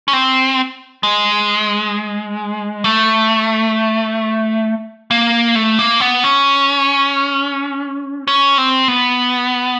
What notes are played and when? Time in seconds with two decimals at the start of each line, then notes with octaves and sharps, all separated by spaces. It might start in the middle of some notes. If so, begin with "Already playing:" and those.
0.08 C#4
0.13 C4
1.03 G#3
2.84 A3
5.11 A#3
5.55 A3
5.79 A#3
6.00 B3
6.24 C#4
8.28 C#4
8.58 C4
8.88 B3